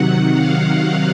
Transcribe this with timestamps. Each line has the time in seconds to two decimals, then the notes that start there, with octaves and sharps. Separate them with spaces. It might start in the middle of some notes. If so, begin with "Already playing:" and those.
Already playing: C3 D#3 F#3 F#5
0.31 F5